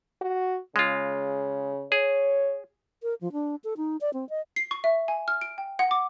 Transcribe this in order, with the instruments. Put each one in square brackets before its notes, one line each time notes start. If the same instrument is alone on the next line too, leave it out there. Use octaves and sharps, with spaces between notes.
[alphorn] F#4
[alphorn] C#3 [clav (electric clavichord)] G#3 F4
[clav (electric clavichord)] G#4 [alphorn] C#5
[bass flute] A#4
F3
D4
A4
D#4
D5
C4
D#5
[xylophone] C7
C#6
E5
G#5
F6
D7
G5
F#5
D6